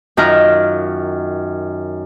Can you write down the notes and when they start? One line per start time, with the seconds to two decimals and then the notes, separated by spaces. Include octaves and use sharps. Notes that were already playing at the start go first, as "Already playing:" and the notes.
0.17 F#2 D#3 F4 A#5 F6